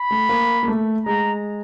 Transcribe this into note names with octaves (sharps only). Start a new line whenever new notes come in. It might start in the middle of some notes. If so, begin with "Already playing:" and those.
Already playing: B5
A3
A#3
A#3
A3
G#3 A#5